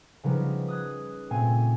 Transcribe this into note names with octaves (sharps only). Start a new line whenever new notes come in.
C#3 F3 G3 B3 D#4 A#4
D#6 F#6 G#6
A#2 A3 C4 G5 G#5 D#7